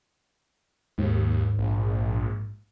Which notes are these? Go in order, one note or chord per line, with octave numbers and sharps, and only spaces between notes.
D#2 G#2
A#1